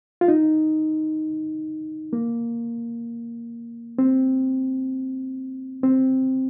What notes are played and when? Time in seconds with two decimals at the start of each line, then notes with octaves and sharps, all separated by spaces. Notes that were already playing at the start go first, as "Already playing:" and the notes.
0.21 F4
0.28 D#4
2.13 A#3
3.98 C4
5.83 C4